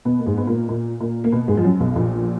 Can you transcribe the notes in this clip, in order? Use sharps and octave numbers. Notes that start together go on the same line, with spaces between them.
B2 B3
A#3
G#2 G#3
B3
A#2 A#3
A#2 A#3
A#2 A#3
A#3
B2 B3
G#2 G#3
F3
F#2 F#3
B1 B2
A#1 A#2